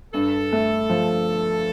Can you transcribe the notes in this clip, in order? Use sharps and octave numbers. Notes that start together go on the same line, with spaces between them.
G2 A4
A3
F3